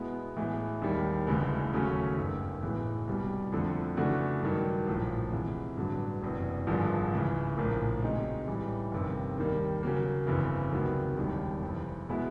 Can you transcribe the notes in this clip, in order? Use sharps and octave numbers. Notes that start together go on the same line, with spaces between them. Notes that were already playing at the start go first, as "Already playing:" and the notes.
Already playing: B2 G#3 B3 E4
A2 E3 G#3 B3 E4
D#2 D#3 G3
E1 D2 C#3 E3 G#3
D#2 C#3 F#3 A3 C#4
G1 F#2 D#3
A1 A2 E3 G#3 B3
C2 B2 G3
F2 D3 F3 A3
C#3 E3 A3 D4 F#4
G2 D#3 F#3
A#1 A2 F3
E2 C3 E3 G#3
A1 G2 D3 F#3
F#1 E2 C3
G#1 G2 D3 F3 G#3
C#2 C#3 E3
A#1 A2 F3 A#3
C#2 B2 G#3 C4 D#4
A1 A2 E3 G3
G1 F2 C3 D#3
D#2 D#3 G3 A#3
C#3 F#3 A#3
G1 F2 C#3 E3
C#2 C3 D#3 F#3 B3
E1 D#2 D#3 G3
F2 C3 E3
B2 G#3 B3 E4